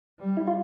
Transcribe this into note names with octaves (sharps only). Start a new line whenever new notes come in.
G3
E4
F4